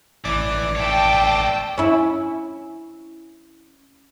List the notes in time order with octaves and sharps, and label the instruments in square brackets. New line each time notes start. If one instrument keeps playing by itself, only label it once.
[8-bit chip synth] A1 D5 D6 [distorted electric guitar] E3
[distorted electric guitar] C#5 E5 [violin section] G5 A5
[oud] C#4 E4